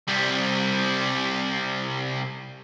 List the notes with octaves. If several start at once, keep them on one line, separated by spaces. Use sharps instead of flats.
C2 G3